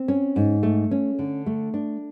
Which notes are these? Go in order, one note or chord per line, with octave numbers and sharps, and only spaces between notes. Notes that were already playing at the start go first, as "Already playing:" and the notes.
Already playing: C4
C#4
G#2
A3
C#4
D3
A3
D4